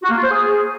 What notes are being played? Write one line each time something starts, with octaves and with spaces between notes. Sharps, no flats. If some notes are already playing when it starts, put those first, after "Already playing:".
F#4
A#3
F4
C5
G#4